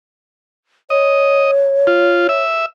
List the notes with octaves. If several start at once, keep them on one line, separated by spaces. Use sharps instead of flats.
C#5 D#5
F4
E5